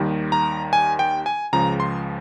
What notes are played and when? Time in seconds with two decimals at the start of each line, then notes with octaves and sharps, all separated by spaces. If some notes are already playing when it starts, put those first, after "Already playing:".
Already playing: D#2 D#3 G3
0.32 A#5
0.73 G#5
0.99 G5
1.26 G#5
1.53 C#2 C#3 F3 A#5
1.80 C6